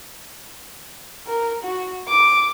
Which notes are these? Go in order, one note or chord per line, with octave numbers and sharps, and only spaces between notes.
A#4
F#4
D6